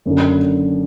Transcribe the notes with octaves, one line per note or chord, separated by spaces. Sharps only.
F#1 F#2 D3